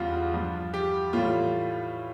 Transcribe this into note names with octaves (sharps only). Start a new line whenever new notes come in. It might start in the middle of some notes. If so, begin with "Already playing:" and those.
Already playing: E2 C#3 G3 F4
G2 F3
G4
A2 E3 G3 F4